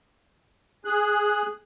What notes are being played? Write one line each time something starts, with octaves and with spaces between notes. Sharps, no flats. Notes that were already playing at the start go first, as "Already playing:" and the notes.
G#4 F#6